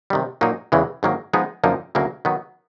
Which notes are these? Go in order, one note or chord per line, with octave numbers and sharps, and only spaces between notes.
C3 D#3 G3
A#2 F#3 A#3 D#4
E2 C#3 E3 G#3
G#2 D#3 F#3 A#3
F3 G#3 B3 D#4
F#2 D3 F3 A#3 D#4
D2 C#3 F#3 A#3
D#3 F#3 B3